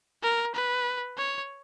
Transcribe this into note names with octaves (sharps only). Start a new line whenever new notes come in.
A#4
B4
C#5